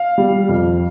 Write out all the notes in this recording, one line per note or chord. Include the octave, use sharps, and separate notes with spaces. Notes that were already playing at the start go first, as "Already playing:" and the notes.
Already playing: F5
G3
F2